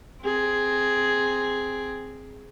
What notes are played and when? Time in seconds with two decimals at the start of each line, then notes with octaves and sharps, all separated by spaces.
0.23 C4 G#4